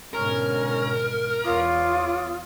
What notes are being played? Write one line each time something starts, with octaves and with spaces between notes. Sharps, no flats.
G#2 B2 D3 C#4 A#4
E2 F4 C#5 D6 D#6